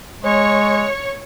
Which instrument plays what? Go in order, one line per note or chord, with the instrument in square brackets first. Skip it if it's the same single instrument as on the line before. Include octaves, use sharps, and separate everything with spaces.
[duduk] G#3 [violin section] C#5